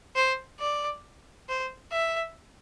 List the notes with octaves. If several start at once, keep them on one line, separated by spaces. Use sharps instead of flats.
C5
D5
C5
E5